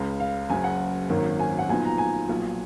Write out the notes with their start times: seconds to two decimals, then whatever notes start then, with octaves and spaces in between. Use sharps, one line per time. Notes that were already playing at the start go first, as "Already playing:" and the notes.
Already playing: C#2 C#3 G#3
0.20 F5
0.50 F#1 F#2 C#3 G#5
0.64 F#5
1.09 G#1 F#2 D#3 A#3 C#4
1.39 G#5
1.59 F#5
1.69 B1 A#2 F3 B3 D#4 G#5
1.85 A#5
1.98 G#5
2.28 B1 A#2 F3